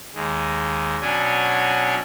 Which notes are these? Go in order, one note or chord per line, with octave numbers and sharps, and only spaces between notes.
D#2 G#3
B2 F#3 C#4 D4 G#5